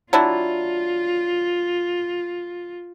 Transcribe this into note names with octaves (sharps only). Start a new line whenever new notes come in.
F#3 D4 E4 F4